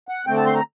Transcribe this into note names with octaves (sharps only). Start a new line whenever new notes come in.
F#5
D3 A3 C4 G5
A5
C6
A#5